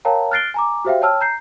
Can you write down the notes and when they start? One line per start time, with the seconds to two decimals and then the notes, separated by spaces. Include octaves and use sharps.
0.05 A#4 C#5 F5 G5 A5 A#5
0.31 F6 F#6 A6 C7 D7 G7
0.54 G#5 A#5 D6
0.85 F#4 G4 C5 E5 F5 G5
1.02 C#5 G5 A5 E6 F6
1.21 A#5 G6 C7